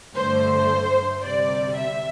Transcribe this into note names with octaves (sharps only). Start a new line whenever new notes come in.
G2 D3 A3 C5
D2 C3 G3 D5
E5